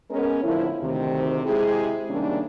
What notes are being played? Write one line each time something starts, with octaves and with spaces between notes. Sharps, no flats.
G#3 B3 C#4 A#4
A2 D3 F3 E4
D2 C3 D#3
C3 G#3 E4 G4 G#4
C3 D#3 G3 A#3 C#4 D4